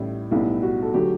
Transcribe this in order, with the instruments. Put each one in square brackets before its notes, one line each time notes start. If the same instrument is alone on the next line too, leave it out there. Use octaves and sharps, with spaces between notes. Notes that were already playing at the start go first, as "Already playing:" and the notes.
Already playing: [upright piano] A1 A2 G3 E4
B1 A2 G3 B3 E4
F#4
A4
D3 F#3 A3 G4